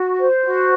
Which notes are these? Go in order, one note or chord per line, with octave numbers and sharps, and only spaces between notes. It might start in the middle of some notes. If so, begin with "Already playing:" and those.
Already playing: F#4
C5
F#4